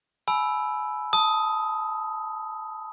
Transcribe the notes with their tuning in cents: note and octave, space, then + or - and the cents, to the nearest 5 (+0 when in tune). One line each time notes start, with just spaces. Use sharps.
G#5 +35 B5 +0 E6 +0
A5 +0 D#6 +10